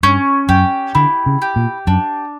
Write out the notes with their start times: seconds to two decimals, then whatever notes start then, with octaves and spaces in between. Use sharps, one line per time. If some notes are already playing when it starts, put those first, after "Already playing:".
0.03 G2 C#4
0.49 F#2 G4
0.95 D3 E4
1.26 C#3
1.42 G4
1.56 A#2
1.87 F#2 D4